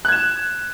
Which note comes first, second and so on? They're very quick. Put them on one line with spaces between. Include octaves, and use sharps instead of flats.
F#6 G#6 E7